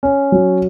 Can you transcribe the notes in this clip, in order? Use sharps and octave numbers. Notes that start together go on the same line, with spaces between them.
C#4
F#3